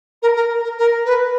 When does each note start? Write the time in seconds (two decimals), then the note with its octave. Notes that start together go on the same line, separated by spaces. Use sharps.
0.22 A#4
0.36 A#4
0.64 A#4
0.78 A#4
1.05 B4